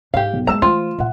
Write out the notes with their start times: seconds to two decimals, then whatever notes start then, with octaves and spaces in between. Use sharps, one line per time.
0.14 G#2 G4 F5
0.33 B1
0.47 G#3 A#3 E4 A5 A#5 E6 E7
0.62 E3 A3 F4 C5
0.98 A#2 F3 E5 F#5